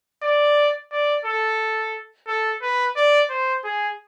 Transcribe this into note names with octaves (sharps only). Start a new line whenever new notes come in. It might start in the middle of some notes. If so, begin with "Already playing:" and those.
D5
D5
A4
A4
B4
D5
C5
G#4